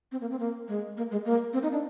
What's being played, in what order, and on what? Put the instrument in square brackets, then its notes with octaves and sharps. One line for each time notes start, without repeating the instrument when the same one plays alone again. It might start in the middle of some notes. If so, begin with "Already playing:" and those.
[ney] C4
A#3
C4
A#3
G#3
A#3
G#3
A#3
C4
D#4
D4